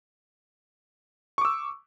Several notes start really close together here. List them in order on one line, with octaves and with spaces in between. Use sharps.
C#6 D6 E6